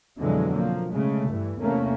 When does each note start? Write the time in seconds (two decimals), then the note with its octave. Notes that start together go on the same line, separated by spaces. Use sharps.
0.19 F2 B2 D3 E3 F#3 G#3
0.53 F3 A#3
0.93 C#3 G#3 A3
1.29 G2 E3
1.59 E2 C3 A3 A#3 C#4